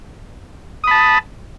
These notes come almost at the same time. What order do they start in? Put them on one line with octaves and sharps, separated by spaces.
D#6 B5 A5